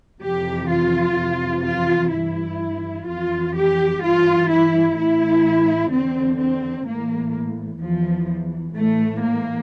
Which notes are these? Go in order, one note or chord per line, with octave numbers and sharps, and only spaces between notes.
F2 C3 E3 G4
F4
F2 C3 E3
F4
G2 E3 E4
F2 E3 F4
G4
G2 E3 F4
E4
A2 E3 E4
E2 D3 C4
C4
A2 E3 A#3
E2 E3 F3
A2 E3 A3
A#3